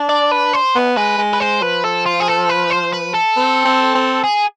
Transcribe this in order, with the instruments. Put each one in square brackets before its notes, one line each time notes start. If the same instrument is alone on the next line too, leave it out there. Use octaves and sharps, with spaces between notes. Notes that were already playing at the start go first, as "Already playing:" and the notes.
Already playing: [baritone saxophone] D4
[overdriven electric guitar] D5
B4
C5
[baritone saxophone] B3
[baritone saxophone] G#3 [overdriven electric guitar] B4
[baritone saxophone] G#3
[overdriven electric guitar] B4
[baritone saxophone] G#3 [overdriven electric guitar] C5
[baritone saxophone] F3 [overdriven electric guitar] B4
[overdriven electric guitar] A4
F4
G#4
A4
B4
C5
B4
A4
[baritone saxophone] C4
C4
C4
[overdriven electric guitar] G#4